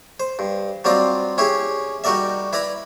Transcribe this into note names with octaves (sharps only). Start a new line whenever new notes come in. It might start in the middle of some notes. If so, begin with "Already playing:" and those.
C5
G2
F#3 G3 C4 F4 D5 D#5
C#4 E4 G4 G#4
G3 D#4 F#4 A#4 D5 E5
E4 B4 D5 A#5 B5